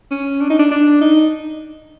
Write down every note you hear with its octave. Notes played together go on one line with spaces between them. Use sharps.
C#4
D4
D#4
D4
D4
D#4